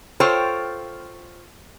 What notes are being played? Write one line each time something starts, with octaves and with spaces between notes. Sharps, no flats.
F4 A4 C5 C#5 G5